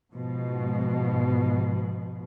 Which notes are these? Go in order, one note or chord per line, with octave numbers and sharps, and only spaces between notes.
G#2 B2 F3